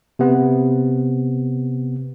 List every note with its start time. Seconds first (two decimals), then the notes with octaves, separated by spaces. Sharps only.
0.19 C3 B3